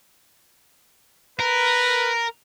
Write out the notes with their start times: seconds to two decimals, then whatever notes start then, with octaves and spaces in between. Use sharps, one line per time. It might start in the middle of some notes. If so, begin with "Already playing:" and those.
1.40 A#4 B4